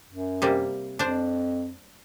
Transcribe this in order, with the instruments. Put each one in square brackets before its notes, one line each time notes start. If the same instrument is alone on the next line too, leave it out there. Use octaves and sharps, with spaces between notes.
[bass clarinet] F#2
[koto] C3 G3 A#3
[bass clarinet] F2 [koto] D4 C5